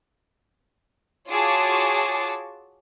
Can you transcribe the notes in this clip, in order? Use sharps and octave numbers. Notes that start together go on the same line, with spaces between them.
F4 F#4 G#4 C#5 A5 D6